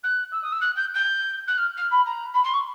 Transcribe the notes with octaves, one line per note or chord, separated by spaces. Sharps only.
F#6
E6
D#6
E6
F#6
G6
G6
F#6
F6
F6
B5
A#5
B5
C6
C#6